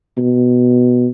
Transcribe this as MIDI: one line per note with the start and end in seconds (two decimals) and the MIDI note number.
0.17 1.07 47